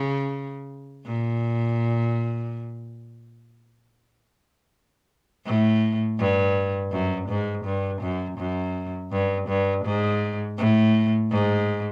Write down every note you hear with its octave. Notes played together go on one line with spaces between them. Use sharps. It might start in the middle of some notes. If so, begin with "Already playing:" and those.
Already playing: C#3
A#2
A2
G2
F#2
G#2
G2
F#2
F#2
G2
G2
G#2
A2
G#2